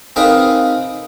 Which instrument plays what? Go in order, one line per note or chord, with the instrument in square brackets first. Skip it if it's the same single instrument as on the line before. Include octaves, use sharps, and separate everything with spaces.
[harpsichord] C4 D#4 G#4 A#4 B4 F5